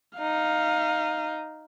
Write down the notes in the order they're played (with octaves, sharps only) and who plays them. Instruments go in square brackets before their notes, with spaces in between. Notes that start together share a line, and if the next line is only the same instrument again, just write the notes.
[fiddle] D#4 [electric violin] F5